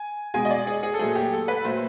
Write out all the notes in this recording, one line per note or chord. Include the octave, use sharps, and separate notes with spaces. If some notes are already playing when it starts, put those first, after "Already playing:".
Already playing: G#5
B2 G#3 G#5
D#5
D5
G#4
G#4
A4
A#2 F#3 A3 G#4
G4
A4
B4
A#2 F#3 A3 C5